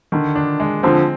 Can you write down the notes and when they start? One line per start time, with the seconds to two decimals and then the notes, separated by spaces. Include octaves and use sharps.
0.12 D3 D#3
0.35 D4
0.60 G#3
0.83 D3 F3 C4